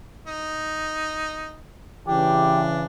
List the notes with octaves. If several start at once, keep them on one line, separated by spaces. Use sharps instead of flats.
D#4
C#3 E3 D4 G4